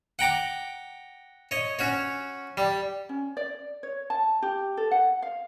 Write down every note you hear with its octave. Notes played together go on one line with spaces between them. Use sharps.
F#5 G5 A#5 D6
C#5 D#5
C#4 F#4 C#5
G3
C#4
D5
C#5
A5
G4
A4
F#5
F5